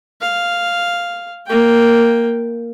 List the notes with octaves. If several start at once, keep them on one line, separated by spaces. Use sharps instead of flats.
F5
A#3 G5